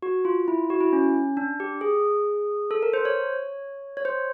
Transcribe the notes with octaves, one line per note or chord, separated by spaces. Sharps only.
F#4
F4
E4
F#4
E4
C#4
D4
G4
G#4
A4
A#4
C5
C#5
C#5
C5